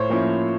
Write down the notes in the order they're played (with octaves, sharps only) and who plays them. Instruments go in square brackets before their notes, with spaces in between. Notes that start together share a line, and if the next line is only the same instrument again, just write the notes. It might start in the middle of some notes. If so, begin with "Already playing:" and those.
Already playing: [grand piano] A2 C5 C#5
F3 A#3 C#4 E4